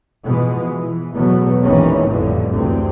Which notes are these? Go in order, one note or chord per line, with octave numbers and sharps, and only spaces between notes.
B2 E3 F3 G#3 B3
E3
E2 B2 F#3 A3 B3
G#1 A#2 D#3 E3 A#3 C#4
A1 F2 A#2 D3 E3 G3
F#1 D2 G2 C3 E3 C4